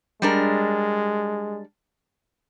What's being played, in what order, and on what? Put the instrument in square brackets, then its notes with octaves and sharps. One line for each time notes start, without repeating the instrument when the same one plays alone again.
[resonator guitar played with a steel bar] G3 D4 A#4 [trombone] G#3